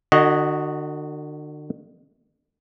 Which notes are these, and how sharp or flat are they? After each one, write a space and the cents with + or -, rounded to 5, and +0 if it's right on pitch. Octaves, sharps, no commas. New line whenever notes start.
D3 +40 F#4 +0 D#5 +0